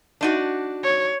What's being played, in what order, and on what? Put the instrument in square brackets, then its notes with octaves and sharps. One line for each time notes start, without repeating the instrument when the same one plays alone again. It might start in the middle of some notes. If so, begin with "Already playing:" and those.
[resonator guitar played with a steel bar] D4 D#4 F#4
[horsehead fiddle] C#5